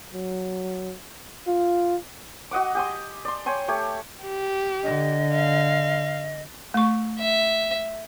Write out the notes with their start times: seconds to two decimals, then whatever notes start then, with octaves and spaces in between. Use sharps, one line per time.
0.14 F#3
1.47 F4
2.51 F#4 D#5 F#5 D6
2.75 G4 G#5 C6
3.25 D5 C6
3.46 C#5 G5 G#5 C6
3.68 A3 G4 C#5
4.23 G4
4.83 D3 D#5
5.34 F5
6.74 A3 C#6
7.19 E5